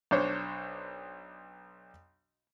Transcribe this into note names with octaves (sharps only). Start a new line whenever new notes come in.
B1 D4 C5 C#5